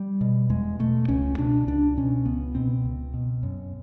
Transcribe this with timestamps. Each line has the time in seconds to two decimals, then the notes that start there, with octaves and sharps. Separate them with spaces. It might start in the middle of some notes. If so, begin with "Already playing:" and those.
Already playing: G3
0.21 B2
0.50 E2 G#3
0.79 B2 A3
1.08 C#2 C#4
1.38 B2 D4
1.67 C#2 D4
1.97 B2 C#4
2.25 C#2 B3
2.55 B2 C4
2.85 C#2
3.14 B2
3.43 F#2